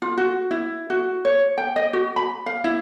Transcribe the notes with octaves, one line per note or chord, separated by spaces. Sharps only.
F4
F#4
E4
F#4
C#5
G5
D#5
F#4
B5
F5
E4